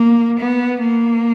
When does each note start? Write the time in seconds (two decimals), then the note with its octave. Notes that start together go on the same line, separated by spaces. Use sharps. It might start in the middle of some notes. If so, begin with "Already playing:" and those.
Already playing: A#3
0.40 B3
0.85 A#3